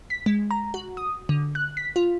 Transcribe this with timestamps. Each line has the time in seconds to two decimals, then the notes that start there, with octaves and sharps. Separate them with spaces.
0.10 B6
0.26 G#3
0.51 A#5
0.74 F#4
0.97 D#6
1.29 D3
1.55 F#6
1.77 B6
1.96 F4